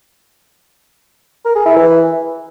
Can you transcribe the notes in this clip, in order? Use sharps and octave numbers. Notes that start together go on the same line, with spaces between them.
A#4
G#4
E4
E3